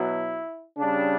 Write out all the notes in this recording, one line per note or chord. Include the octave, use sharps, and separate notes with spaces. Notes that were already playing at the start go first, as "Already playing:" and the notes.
Already playing: B2 F#3 E4
C#3 G3 D4